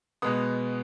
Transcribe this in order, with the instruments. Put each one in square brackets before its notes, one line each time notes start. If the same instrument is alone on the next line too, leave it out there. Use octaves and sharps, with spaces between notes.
[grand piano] B2 G#3 B3 D#6